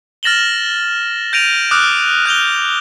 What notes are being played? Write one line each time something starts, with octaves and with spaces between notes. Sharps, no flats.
F6 A6 A#6 E7 F#7 G7
G6 A#6 D7 D#7 F7
D6 D#6 F6 F#6
F#6 G6 F7 G7